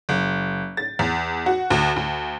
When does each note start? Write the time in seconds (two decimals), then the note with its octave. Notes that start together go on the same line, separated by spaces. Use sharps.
0.09 F#1
0.77 A6
0.99 E2
1.46 F#4
1.70 D2
1.96 D2